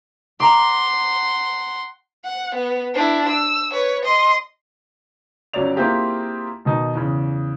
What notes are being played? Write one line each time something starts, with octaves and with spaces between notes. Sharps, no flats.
F#5 A#5 C6 D6
F#5
B3
D4 E4
E6
B4 C#5
D#5 C6
G1 F#3 C#4 C#5 D5 F7
A#3 C4 E4 F4 G4 G#4
B2 D#3 D#4
E2 C#3